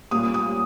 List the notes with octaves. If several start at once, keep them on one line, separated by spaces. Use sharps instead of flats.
A#2 G3 A#3 D#6
D#6